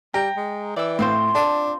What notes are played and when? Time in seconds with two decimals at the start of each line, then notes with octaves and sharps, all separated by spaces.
0.14 G3 G5 A#5
0.36 G#3
0.76 E3 D5 E6
0.99 A2 C4 F4 C5
1.35 D4 A5